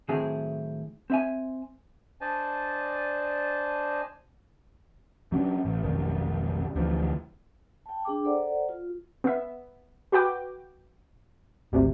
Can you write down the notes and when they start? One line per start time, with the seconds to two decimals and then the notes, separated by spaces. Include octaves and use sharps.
0.09 A2 D#3 F#3 C4 E4 G#4
1.10 C4 E5 G#5
2.21 D4 C5 D5 D#5 G#5 A5
5.32 F#3 C#4 D4
5.65 A1
5.83 F1 B1 D#3
6.76 D2 D3 E3 F3
7.86 G5 A5
8.05 D4 G#4 G5 D6
8.25 A4 C5 D5 F#5 A#5
8.69 F4
9.24 B3 E5
10.12 F#4 B4 G5 D6
11.72 G#1 D2 C3